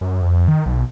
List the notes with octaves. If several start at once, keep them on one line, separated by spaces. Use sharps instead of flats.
F#2
F2
D#3
B1